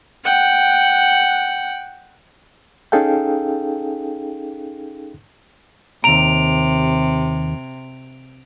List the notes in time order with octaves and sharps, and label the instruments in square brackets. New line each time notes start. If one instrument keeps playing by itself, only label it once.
[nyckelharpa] F#5 G5
[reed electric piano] C#4 D#4 G#4 A4 F5 G5
[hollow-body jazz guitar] D#2 A#5 [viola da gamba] C3 [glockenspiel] D7 F7